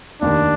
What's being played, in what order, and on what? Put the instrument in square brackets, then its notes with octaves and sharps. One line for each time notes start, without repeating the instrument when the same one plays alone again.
[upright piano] F1 D#2 D#3 [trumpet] D4